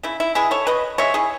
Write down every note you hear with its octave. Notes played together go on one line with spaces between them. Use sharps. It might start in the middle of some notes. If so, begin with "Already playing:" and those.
C#3 E4
E4
E3 G#3 E4 G#4
A4 C#5
C#3 B4 D#5
E3 G#3 C#5 E5
E4 G#4